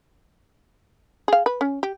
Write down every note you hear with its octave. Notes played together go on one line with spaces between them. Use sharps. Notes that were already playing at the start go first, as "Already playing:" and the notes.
G#4 F5
B4
C#4
G4